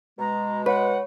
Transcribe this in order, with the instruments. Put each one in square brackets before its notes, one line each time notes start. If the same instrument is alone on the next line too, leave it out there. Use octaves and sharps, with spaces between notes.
[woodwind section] B2 G#3 [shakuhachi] A#5
[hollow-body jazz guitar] B4 [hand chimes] C#5 [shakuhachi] F#5